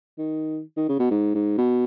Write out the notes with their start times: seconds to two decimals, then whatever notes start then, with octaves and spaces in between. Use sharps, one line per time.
0.18 D#3
0.77 D#3
0.89 C#3
0.99 B2
1.11 G#2
1.35 G#2
1.58 B2